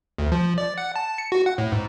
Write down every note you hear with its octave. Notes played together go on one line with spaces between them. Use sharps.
D2
F3
D5
F#5
A5
C#7
F#4
F#5
A2
G#2